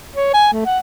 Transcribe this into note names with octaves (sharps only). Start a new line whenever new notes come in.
C#5
G#5
A3
F#5